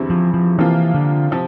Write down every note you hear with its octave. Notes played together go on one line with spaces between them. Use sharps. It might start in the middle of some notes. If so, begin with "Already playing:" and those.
Already playing: E2 D3 G3 C4 E4
F3
F3
C3 E3 F3 A#3 F4
D3
C3 F3